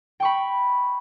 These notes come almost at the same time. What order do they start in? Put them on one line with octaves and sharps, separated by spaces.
G5 C#6 B5